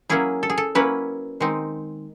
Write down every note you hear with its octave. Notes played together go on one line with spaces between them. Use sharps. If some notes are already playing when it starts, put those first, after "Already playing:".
F#3 A#3 C#4 E4 G#4
A4
G#4
A4
F#3 A#3 C#4 E4 B4
D#3 G#3 C4 D#4